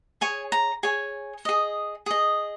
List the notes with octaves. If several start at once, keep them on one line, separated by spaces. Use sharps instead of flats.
G#4 C#5 G#5
A#5
G#4 C#5 G#5
G#4 D#5
G#4 D#5